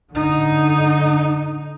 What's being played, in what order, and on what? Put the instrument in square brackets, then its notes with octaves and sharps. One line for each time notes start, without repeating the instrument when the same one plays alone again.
[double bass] D3 D#4